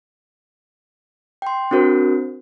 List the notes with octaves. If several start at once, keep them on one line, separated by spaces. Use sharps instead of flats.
G5 C6
C4 D4 F#4 A#4 C5